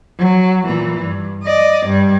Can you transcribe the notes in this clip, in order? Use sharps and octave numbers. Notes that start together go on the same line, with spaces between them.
F#3
A#2 E3
G2
D5 D#5
G2 G3